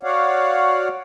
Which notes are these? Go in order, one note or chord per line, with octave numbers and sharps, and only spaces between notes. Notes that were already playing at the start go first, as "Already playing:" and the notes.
F#4 C#5 D5 F5 F#5